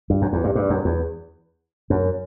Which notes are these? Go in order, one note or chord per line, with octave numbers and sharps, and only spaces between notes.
G2
F#2
E2
G2
G2
F#2
E2
F#2